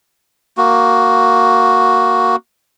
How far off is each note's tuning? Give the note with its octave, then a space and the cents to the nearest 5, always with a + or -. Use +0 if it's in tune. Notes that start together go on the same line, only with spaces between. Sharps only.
A#3 +0 F#4 +0